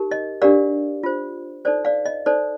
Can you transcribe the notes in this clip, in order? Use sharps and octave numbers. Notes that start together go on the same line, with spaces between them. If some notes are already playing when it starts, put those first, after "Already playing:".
Already playing: D#4 G4 A#4
D#5
D4 G4 A#4 D5 F5
F4 C5
D#4 A4 C5 D5
D5 F5
D#5
D#4 A4 C5 D5